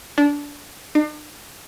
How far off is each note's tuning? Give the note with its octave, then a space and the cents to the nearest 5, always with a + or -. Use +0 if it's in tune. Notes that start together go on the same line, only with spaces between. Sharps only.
D4 -20
D4 +45